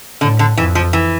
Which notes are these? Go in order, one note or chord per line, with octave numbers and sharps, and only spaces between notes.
A2 D3
D3
F2 E3
F3
E3